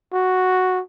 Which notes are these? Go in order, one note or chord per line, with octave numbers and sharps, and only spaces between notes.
F#4